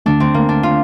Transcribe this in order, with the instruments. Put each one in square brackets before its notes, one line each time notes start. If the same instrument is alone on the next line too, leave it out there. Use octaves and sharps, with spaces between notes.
[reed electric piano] D2 D3 A3 [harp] D4
[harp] C4
A#3
D4
F4